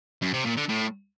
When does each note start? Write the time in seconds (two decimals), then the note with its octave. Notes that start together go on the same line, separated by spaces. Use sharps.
0.22 F#2
0.33 C3
0.45 A#2
0.57 D3
0.69 A2